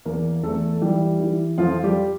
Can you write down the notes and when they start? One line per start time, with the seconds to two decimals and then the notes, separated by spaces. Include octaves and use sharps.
0.05 E2 A#3
0.43 E2 A3 A4
0.81 E3 G3 G4
1.19 E3
1.58 F2 F3 F4
1.83 G3 G4